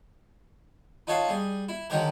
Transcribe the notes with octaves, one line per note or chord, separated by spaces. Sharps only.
D#4 F4 A4 C#5 F5 F#5
G3 G#4
E4
D3 D#3 F#3 G#3 G4 A#4